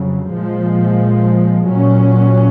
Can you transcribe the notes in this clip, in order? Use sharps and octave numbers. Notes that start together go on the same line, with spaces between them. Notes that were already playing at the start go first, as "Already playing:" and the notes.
Already playing: F2 C#3 F#3
A#2 F3 G#3
A#2 F#3 C#4